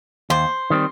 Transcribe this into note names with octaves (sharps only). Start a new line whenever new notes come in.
D#2 C5
D#3 G3 C4